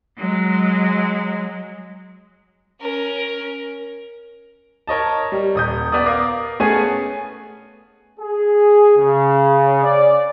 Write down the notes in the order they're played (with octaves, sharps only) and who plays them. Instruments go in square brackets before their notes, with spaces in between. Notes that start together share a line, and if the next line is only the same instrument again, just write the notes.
[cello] F#3 G#3
[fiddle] C#4 A#4
[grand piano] A#4 C#5 D#5 A5
G3
D#1 D#6 G6
B3 D5 D#6
A#4 F5 D6 D#6
A3 B3 C#4 G#4 G#5
[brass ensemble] G#4
C#3
D5